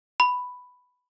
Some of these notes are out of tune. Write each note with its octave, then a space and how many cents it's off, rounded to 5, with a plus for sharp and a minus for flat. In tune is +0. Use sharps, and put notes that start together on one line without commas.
B5 +5